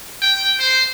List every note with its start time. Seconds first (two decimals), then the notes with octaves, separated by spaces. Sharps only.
0.22 G5
0.60 C5